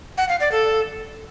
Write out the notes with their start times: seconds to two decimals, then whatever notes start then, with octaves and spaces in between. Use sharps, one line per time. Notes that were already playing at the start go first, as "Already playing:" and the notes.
0.18 F#5
0.29 F5
0.40 D5
0.52 A4